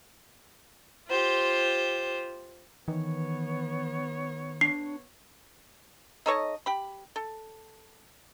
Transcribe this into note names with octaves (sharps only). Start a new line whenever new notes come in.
F4 G4 C5
D#3 E3 B3 C#5
D4 C7
D#4 A4 C#5 D#5
G4 B5
A4